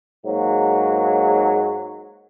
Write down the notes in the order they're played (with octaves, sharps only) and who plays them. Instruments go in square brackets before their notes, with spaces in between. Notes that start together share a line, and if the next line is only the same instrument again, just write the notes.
[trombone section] G#2 F#3 A#3